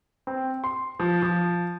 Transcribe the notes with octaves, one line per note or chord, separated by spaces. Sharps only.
C4
C6
F3
F3